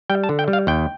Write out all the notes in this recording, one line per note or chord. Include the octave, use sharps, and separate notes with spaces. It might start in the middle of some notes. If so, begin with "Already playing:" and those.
G3 G5
A5
D3
G5
G3
F5
D#2 G5